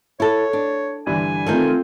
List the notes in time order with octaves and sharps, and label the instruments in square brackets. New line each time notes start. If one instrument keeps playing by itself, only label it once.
[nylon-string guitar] E4 A4 [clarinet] C#5
[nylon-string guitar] D4
[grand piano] G2 D3 E3 [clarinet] G#5
[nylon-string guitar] D#3 A3 D#4 [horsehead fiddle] C4 F4 [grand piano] A4 G6